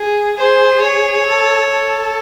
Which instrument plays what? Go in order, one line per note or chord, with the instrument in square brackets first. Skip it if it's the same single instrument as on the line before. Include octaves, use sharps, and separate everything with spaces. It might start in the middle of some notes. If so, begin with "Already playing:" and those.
Already playing: [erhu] G#4
[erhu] G#4 [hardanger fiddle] C5
[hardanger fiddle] C#5
[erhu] A4
A4